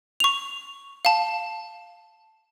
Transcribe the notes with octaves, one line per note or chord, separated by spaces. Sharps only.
C#6 F7
F5 A5